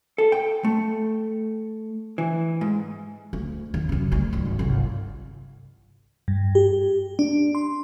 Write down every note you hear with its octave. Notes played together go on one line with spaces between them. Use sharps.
A4
G5
A3
E3
G#2
D2
D#2
F#2 C#3
D2 G3
G#1 D#3
G1 C2
G2
G4
D4
C6